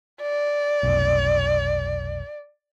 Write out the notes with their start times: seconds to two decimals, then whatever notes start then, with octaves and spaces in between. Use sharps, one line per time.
0.21 D5
0.83 F1 B1